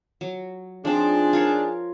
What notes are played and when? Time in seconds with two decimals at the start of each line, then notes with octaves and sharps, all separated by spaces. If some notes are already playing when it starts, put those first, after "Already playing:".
0.21 F#3
0.85 F3 C4 D4 D#4 G#4
1.33 F4 A#4 C#5